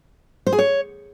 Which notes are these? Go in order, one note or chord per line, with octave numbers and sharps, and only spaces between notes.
C5
G#4
C#5